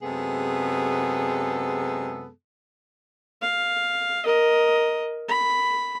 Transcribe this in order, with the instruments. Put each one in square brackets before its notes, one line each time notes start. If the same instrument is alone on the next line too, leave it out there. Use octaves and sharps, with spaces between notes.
[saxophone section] F#2 C3 G#3 B3 G#4 A4
[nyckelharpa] F5
A#4 D#5
B5